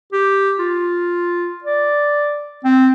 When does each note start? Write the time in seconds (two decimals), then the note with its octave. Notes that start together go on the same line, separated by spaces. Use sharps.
0.13 G4
0.59 F4
1.64 D5
2.64 C4